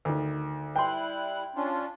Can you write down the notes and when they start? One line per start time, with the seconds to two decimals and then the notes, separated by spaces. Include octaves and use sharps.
0.05 D2 D#3
0.76 G3 E4 G5 C6 F#6
1.56 C#4 D4 F4